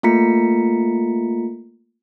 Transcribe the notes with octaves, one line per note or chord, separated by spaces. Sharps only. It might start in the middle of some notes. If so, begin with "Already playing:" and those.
A3 A#3 F4 A#5 B6 C#7